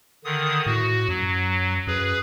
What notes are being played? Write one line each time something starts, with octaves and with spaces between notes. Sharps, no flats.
D3 D#3 D#6
A2 F#4
F#2 F#3
F#2 G#4 B4